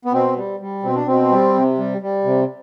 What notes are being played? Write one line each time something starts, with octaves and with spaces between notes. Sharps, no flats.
B3
B2 C4
G3
G3
B2 C4
D4
B2 C4
G3
C3
G3
G3
C3